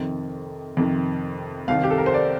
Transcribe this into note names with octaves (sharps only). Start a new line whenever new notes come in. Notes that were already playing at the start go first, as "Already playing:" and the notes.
Already playing: F2 C3 D#3
F2 C3 D#3
C2 C3 D#3 F5
G4
A4
A#4
C5
D5